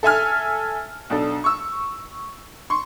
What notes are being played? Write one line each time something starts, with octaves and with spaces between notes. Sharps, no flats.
A4 E5 G#5 F6
B1 D4 A4
C#6 E6
C6 C#6